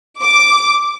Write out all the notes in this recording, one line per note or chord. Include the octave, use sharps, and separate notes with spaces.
D6